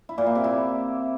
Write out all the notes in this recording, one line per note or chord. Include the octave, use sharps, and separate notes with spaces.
E4
A#2
A#3
C3
E4